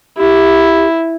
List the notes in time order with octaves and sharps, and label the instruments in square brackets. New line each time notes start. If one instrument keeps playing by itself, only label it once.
[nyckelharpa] E4 [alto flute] G4